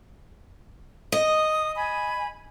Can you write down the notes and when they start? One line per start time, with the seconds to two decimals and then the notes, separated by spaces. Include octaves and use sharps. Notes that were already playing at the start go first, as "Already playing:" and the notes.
1.12 D#5 D#6
1.75 G#5 B5